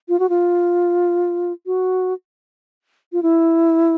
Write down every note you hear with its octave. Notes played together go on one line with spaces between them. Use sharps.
F4
F#4
F4
F#4
F4
E4